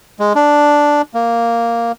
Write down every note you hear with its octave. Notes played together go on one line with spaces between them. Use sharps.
G#3
D4
A#3